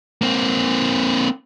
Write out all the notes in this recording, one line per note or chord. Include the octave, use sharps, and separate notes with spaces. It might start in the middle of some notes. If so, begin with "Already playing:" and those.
A#3 C4